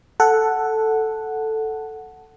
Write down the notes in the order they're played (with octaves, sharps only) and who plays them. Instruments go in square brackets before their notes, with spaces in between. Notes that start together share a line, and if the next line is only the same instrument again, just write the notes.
[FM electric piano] A4 F#5